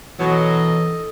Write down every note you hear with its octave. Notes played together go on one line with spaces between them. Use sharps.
B2 E3 F#3 A4 D#5